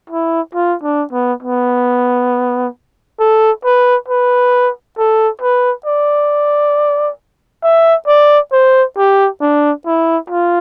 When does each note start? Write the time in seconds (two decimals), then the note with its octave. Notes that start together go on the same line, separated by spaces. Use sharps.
0.10 E4
0.55 F4
0.83 D4
1.13 B3
1.43 B3
3.20 A4
3.65 B4
4.08 B4
4.98 A4
5.42 B4
5.86 D5
7.64 E5
8.08 D5
8.53 C5
8.97 G4
9.41 D4
9.87 E4
10.30 F4